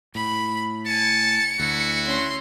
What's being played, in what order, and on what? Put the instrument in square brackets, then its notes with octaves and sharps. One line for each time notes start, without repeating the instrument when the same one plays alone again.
[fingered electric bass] A2 [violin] B5
[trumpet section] G#5 A5 [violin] C#7
[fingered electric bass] D2 [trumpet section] E4 F#4
[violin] C#4 C6